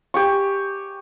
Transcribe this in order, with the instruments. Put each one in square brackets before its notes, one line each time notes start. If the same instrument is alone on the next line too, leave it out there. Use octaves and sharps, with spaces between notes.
[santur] G4 G#5 C#6